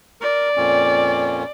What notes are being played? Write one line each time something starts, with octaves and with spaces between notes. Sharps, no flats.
A#4 D5
F2 A#2 C#4